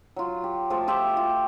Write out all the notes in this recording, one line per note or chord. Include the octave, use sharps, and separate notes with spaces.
F#3 F4
G4
F3 A3 F4 A5
F4 G4 E5
F4